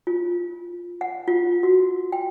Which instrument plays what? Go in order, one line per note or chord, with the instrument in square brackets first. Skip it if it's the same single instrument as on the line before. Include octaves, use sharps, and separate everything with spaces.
[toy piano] F4
F#5
F4
F#4
G5